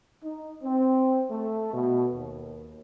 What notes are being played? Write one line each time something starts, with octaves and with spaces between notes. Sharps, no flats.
D#4
C4
A3
B2
D#2